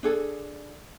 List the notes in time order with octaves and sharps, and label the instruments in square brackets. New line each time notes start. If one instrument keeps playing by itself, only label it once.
[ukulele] D4 G#4 A4